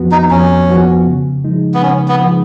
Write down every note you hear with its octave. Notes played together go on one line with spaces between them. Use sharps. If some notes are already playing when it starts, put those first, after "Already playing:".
Already playing: F2 F3 B3 F#4
D#4
F2 C#4
F3 B3 F#4
C#3
F3 G#3 D#4
B3
C#3 C#4
B3
F3 G#3 D#4